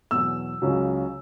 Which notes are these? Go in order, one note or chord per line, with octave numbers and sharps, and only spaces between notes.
E2 B2 F#3 E6
C#2 C#3 F#3